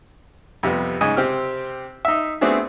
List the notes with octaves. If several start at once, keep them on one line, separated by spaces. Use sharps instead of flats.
F2 C3 G3 B3
G#2 C#3 D#5 G#5 D#6
C3 C4 G4 F6
D#4 E5
A3 B3 C4 D4 F#4 G#4